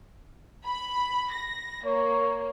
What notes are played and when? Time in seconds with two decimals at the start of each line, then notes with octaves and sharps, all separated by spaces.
0.66 B5
1.32 A#6
1.86 A#3 C#5